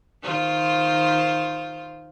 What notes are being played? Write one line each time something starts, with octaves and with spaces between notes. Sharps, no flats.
D#3 F4 C5